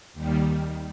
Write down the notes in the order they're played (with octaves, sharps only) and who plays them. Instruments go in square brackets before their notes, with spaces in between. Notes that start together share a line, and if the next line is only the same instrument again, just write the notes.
[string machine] D#2 D#3 G3